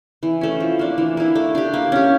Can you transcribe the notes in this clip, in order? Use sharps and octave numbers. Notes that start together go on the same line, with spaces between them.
E3
A3 C#4
F3
A#3 D4
E3
A#3 E4
A3
D4 G4
A#3
C#4 G4